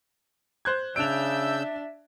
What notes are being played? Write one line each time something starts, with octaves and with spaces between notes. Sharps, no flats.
C5 F#6 G#6
C#3 D4 E5 E6 G6 D7 F7